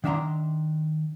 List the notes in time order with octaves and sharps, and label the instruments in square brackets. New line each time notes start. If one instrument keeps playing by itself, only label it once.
[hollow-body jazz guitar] D#3 D4 E5 F#5 A#5 C6